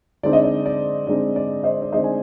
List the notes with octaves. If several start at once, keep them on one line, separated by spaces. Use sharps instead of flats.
D3 G#3 C4 D#4 D5
D#5
D5
D5
D3 G#3 C4 D#4 D5
D5
C5 D#5
D5
D3 G#3 C4 D#4 C5 D#5
G#5